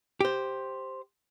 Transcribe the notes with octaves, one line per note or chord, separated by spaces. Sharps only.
G4 C5